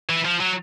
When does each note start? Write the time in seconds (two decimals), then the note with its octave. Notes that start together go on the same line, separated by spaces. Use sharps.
0.09 E3
0.25 F3
0.40 F#3